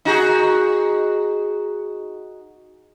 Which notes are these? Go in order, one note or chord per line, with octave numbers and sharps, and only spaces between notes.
D#4 F#4 G#4